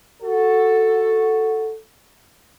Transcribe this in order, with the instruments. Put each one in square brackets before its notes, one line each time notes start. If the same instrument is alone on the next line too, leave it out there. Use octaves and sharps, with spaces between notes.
[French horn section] F#4 A4